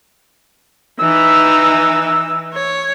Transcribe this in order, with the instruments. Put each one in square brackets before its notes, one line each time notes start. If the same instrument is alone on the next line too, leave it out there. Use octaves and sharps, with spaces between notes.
[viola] E3 D#4 [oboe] E6
[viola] C#5